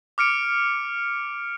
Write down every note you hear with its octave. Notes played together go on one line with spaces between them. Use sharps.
D6 F6 C#7 D7